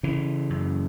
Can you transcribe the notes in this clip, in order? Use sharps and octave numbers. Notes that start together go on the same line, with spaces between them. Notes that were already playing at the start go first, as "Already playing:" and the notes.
C#3 E3
F#2